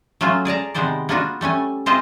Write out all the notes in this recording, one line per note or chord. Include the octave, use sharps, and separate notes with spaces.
F#3 A3 A#3 C#4 F4
G#4 D5 A5 A#5
C3 D#3 G#3 B3 C5 D5
A#3 B3 D4 F4 F#4
G3 A3 C#4 G#5
C4 E4 F4 G#4 C5 D#5